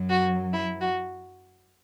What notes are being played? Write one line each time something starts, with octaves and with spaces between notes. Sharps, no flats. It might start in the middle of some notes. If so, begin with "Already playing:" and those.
Already playing: F#2 F#3
F#4
E4
F#4